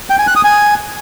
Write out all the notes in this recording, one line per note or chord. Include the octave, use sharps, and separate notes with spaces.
G5
G#5
F#6
D#6
G#5